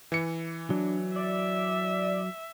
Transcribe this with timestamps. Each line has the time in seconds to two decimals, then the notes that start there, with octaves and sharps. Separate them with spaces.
0.12 E3 C#7
0.70 F#3 D4
1.16 D5 E5